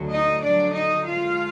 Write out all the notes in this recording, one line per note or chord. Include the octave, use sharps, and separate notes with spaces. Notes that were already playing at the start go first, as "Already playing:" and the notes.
Already playing: D2 D3 F#3
D#4 D#5
F2 D3 F#3 D4 D5
D#4 D#5
F2 F3 G#3 F4 F5